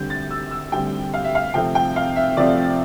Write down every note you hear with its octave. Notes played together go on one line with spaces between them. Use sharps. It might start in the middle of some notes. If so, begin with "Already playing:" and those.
Already playing: D3 G3 C4 G6
A6
E6
E6
D3 G3 C4 G5
F5
E5
F5
C3 F3 A3 C4 G5
G5
F5
E5
C3 F3 A3 C4 D5